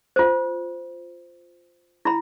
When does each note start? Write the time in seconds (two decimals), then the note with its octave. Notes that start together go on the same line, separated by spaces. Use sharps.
0.16 F4 C5
2.05 E4 B5